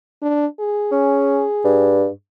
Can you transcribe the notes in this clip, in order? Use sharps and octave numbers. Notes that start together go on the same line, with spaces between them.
D4
G#4
C#4
G2